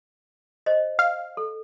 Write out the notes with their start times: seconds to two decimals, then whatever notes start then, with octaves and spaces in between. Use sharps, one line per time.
0.66 C5 D#5
0.99 F5
1.37 A4